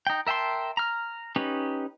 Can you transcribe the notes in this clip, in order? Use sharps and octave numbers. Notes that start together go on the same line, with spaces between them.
D#4 G5
A#4 E5 G5 A5 C6
A#5 F6
C#4 D#4 G4 B4